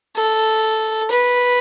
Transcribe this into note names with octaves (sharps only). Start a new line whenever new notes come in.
A4
B4